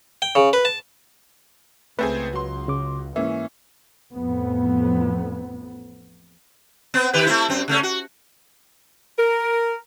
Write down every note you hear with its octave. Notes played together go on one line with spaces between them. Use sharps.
G5
C#3
B4
A5
C#2 A3 C4 G#4 B4
F#3 C6
C#3 D6
G#2 E3 A#3 C#4 E5
A1 F2 B3
B3 C4
D#3 G4 B4
A3 C4 E4
F#2 C4
C#3 A3 C#4
F#4
A#4